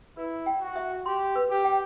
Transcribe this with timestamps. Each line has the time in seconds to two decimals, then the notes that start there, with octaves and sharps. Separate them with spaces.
0.17 E4 B4
0.46 G5
0.61 F#4
0.76 E5
1.06 G4 C6
1.35 B4
1.51 G4
1.65 G5